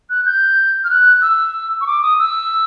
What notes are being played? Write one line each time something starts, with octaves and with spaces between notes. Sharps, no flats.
F#6
G6
F6
F#6
E6
C#6
D6
D#6
E6